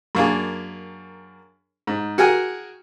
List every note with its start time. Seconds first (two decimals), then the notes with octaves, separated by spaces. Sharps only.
0.15 F#2 A#3 D4 G#4
1.87 G#2
2.18 F#4 G#4 A#4 G5 G#5